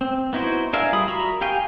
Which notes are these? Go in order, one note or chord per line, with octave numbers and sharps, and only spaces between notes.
C4
B3 D#4 E4 F#4 C5
D4 G#4 A#4 E5 F5
G3 F4 B5 D#6
F#4 A#4 E5 A#5 B5
G4 F5 G5 G#5